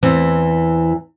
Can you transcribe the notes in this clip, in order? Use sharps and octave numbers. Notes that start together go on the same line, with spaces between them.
E2 E3 B3 C4